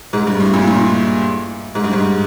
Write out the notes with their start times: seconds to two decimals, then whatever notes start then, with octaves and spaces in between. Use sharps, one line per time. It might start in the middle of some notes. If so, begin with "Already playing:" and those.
0.13 G#2
0.27 G2
0.40 A2
0.54 A#2
0.67 A#2
1.75 G#2
1.84 G2
1.93 G#2